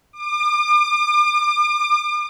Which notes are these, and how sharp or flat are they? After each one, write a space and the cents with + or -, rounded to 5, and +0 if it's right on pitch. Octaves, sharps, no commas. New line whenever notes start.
D6 +40